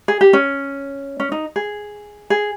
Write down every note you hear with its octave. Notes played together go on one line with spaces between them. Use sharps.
G#4
G4
C#4
C#4
D#4
G#4
G#4